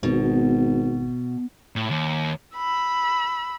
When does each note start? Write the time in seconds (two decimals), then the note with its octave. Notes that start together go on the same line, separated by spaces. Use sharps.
0.03 G#1 B2
1.76 A2
1.91 D#2
2.55 B5 E6